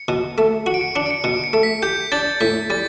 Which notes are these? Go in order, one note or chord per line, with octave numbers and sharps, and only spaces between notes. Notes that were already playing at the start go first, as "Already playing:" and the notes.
Already playing: C#7
B2
A3
F#4 C#7
D7
C#7
D4 C#7
D7
C#7
B2 C#7
C#7
A3
B6
G4 G6
D4 A6
A2 B6
G3 A6